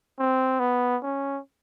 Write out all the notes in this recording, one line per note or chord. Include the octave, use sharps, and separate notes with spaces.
C4
B3
C#4